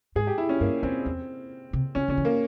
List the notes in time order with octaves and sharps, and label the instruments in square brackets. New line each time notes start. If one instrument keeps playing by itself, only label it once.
[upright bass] G#2 [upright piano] G#4
[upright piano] G4
E4
C#4
[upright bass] G2 [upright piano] A#3
[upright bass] F2 [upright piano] C4
[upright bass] E2
C3
[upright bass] C#3 [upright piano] C#4
[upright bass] C#3 [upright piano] C#4
[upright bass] E3
[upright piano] A#3